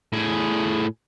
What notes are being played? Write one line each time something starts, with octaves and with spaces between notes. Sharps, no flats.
A2 G#4